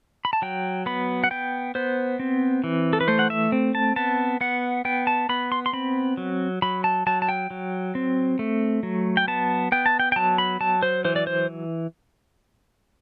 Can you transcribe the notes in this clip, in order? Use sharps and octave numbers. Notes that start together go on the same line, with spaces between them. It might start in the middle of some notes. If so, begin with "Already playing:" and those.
B5
A5
F#3 G5
B3 B5
F#5
B3 G5
B3 C5
C4
E3
A4
B4
A3 C5
F#5
E5
C4
A5
B3 A5
B3 F#5
B3 G5
A5
B3 B5
C6
C6
C4 B5
F#3
F#3 B5
A5
F#3 A5
A5
G5
F#3
C4
A3
F#3
G5
B3 A5
B3 G5
A5
G5
G5
F#3 A5
B5
F#3 A5
C5
E3 C5
D5
C5